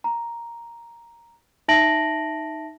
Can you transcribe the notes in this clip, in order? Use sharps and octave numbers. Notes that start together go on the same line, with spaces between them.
A#5
D#4 E5 A5 A#6 D7 F#7